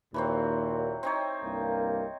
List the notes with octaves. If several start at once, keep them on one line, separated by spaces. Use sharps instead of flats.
D#2 A#2 E3 F#3 C4
C4 D#4 C#5
C2 G2 A#3